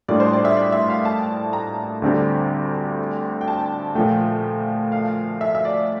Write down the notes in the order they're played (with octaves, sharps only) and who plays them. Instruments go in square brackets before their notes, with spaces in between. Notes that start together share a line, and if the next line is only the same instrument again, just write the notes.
[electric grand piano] A2 G3 A#3 D4 F4 [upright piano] D5
[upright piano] C5
D5
E5
D5
E5
F5
A5
A#5
[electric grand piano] D2 D3 G3 C4 G4
[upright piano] G5
A5
[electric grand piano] A#2 F3 A3 [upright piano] G5
[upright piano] F5
E5
E5
D5